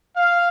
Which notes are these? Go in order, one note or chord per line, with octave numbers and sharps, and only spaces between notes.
F5